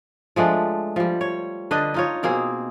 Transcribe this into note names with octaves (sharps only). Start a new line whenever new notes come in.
F3 G#3 A3 D4
F3 G3
C#5
D3 D4 B4 D#5
D#4 F4 C#5
B2 A#3 C4 G#4